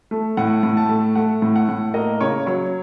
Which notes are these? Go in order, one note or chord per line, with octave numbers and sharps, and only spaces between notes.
A3
A2 F#5
A2
A5
A3
A3 F#5
A2
F#5
A2
A#3 D#5
C#3 C#5
F#3 C#5